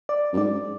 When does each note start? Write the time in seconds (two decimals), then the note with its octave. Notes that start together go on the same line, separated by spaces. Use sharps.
0.09 D5
0.33 F#2
0.37 G#2 D5